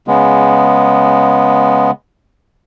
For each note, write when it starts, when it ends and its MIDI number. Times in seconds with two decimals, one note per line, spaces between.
0.08 1.91 49
0.08 1.91 56
0.08 1.91 59